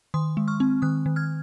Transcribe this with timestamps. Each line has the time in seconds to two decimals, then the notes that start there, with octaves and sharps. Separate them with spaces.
0.14 D#3 C6 D#6
0.37 G#3
0.48 C#6 F6
0.60 C4
0.82 D#3 D#6 F#6
1.06 D#3
1.16 F6 G#6